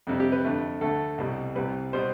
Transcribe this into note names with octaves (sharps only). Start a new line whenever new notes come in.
F2 C3 G3
G4
B4
F2 D3 A3
D2 D3 A3 A4
C2 B2 G3
C2 C3 G3 B4
B2 G3 C5